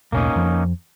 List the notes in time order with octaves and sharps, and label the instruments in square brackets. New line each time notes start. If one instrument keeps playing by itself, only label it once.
[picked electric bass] E1 B1 A2 [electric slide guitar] A#3 C#4 D#4
[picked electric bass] F2 F3